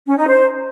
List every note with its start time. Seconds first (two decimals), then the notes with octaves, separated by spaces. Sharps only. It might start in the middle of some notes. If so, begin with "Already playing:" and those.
0.06 C#4
0.17 D#4
0.29 C5